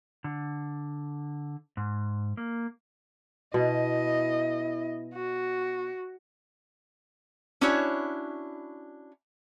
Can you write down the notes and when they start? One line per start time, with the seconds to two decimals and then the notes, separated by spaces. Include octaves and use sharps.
0.24 D3
1.77 G#2
2.37 A#3
3.54 B2 E4 D#5
5.14 F#4
7.61 C#4 D4 E4 F#4 C#5